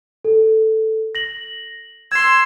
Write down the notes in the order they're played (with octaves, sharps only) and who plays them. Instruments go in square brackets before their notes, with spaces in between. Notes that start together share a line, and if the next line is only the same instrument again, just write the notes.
[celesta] A4
A#6 F#7
[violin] C6 E6 [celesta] G#6 C7